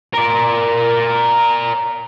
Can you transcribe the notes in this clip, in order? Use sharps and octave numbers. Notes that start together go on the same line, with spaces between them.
A#4 D5